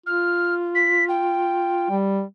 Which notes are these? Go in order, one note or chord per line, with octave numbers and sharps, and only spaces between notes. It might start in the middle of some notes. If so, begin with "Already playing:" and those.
F4 F6
B6
G5
G3